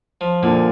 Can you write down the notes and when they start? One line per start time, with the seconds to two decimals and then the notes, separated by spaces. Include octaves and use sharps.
0.21 F3
0.42 A#2 D3